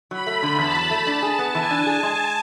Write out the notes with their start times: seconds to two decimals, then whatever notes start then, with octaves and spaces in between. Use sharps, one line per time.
0.11 F#3 B5
0.27 A3
0.43 D3
0.58 E2 A5
0.75 F#3
0.91 A3
1.07 D4
1.23 G#4
1.39 B3
1.55 E3 G#5
1.71 D4
1.86 G#4
2.03 G#3